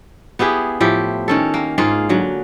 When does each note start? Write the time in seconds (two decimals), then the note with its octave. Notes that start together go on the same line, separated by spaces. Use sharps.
0.39 B3 E4 G4 G#4
0.80 A2 F3 E4 G4
1.28 D#3 C#4 A4
1.54 A#3
1.78 G#2 A#3 F4 G#4
2.09 D3 F#3